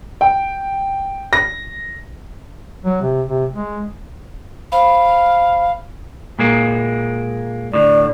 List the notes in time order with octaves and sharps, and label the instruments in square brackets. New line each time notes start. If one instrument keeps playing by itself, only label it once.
[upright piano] G5
A#6
[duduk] F#3
C3
C3
G#3
[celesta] C5 B5 [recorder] F5
[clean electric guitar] A#2 G#3 A#3
[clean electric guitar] A2 D3 [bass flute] D5